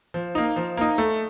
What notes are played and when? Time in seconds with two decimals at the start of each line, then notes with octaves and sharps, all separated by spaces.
0.14 F3
0.35 A#3 D#4
0.56 F3
0.77 A#3 D#4
0.98 A3